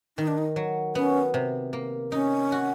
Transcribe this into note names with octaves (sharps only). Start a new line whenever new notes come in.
D#3 D#4
D4
D#4
F#3
B3 C#4
C3
A#3
C#4 D#4
F#4